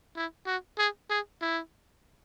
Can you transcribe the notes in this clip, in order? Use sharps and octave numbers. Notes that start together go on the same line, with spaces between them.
E4
F#4
G#4
G#4
E4